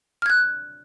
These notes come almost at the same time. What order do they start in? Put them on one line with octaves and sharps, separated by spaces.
F6 G#6 F#6